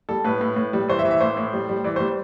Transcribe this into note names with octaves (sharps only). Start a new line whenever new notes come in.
G3 A4
A2 B4
A2
A2
G3
E3 C5
E5
E3
E5
A2 C5
A2
G3
G3
E3 D5
G3 C5